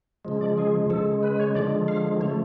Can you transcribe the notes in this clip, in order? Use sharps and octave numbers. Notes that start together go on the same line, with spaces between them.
C#3 F3 G#3
D5
G#4
C#3 G#3 A4
B4
B4
C#5
D3 F3 G#3 D5
F5
C#3 F3 A3 C#5